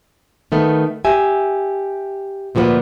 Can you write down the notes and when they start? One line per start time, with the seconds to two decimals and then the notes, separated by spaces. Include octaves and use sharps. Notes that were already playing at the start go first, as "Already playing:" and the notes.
0.52 D#3 A3 B3
1.05 G4 E5 G#5
2.55 D2 A#2 F3 G4 B4 F#5